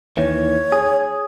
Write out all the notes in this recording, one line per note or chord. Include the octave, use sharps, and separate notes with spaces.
D#2 D#3 E3 C#5
G#4